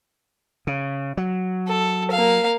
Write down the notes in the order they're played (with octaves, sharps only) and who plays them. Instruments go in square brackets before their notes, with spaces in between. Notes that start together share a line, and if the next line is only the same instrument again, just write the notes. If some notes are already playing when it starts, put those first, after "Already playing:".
[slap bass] C#3
F#3
[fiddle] A4
A#3 F5